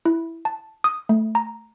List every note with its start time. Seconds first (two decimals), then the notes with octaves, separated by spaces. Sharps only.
0.06 E4
0.45 A5
0.84 D#6
1.09 A3
1.35 A#5